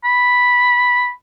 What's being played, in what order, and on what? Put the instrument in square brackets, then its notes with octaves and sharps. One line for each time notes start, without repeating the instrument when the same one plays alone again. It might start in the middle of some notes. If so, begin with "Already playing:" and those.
[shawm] B5